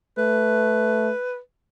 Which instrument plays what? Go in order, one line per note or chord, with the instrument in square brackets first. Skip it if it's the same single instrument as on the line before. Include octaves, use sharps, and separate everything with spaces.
[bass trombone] A3 [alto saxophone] B4